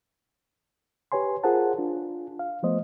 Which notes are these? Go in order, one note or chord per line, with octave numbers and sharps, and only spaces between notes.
G4 B4 C#5 G#5 C6
F4 G#4 A#4 C5 F#5 A5
D4 F4
F5
F3 A3 B3 C5 D#5